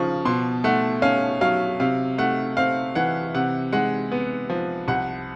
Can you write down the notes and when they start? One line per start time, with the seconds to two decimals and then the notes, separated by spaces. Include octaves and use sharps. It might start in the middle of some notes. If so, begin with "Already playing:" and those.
Already playing: C#3 F3 C#6
0.25 B2 C6
0.64 A3 F#5
1.02 C#4 F5
1.41 F#3 F5
1.80 C3 F5
2.18 A3 F#5
2.57 C4 F5
2.95 E3 F#5
3.34 C3 F#5
3.72 G#3 F#5
4.12 B3
4.50 F3
4.88 C2 F#5